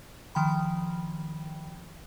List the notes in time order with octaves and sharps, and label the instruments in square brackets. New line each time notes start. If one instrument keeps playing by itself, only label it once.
[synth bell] D#3 F3 G5 B5